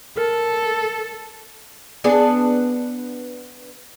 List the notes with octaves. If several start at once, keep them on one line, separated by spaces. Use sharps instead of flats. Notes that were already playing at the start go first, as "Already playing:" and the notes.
A4 A#4
B3 D4 G#4